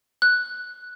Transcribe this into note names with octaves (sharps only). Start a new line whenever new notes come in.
F#6